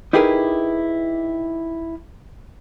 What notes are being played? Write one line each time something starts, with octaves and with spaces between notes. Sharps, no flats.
D#4 E4 G4 G#4 A#4 B4